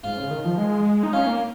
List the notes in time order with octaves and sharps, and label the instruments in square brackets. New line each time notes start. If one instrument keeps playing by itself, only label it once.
[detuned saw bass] G#2 [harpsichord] F4
[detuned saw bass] C#3
D#3
F3
G#3
D#4
[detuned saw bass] C#4 [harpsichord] F4
[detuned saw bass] A#3